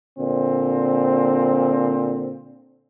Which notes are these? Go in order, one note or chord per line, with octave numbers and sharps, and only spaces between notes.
A#2 D3 C4